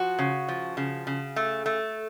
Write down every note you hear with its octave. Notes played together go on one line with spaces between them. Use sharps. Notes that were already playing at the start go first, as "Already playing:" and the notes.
Already playing: F3 F#4
C#3
F3
C#3
C#3
A3
A3